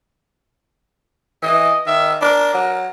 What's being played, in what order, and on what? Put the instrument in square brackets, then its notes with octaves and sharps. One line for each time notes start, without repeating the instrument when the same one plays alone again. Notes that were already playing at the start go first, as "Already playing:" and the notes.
[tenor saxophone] E3 [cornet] D#5
[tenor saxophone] D#3 [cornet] E5
[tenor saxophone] D4 [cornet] A#4
[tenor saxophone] F#3